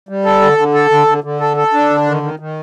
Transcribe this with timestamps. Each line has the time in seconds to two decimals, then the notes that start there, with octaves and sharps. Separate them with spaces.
0.09 G3
0.25 A4
0.42 D3
0.58 D3
0.74 A4
0.91 D3
1.07 D3
1.24 D3
1.41 A4
1.57 A4
1.73 D4
1.90 D3
2.06 D#3
2.23 D#3
2.39 D#3